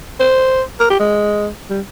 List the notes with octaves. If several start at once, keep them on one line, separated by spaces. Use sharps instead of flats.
C5
A#4
G4
G#3
G3